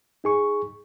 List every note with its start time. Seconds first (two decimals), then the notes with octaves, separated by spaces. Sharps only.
0.24 D#4 G#4 C#6